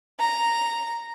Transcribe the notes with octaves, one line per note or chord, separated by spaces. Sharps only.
A#5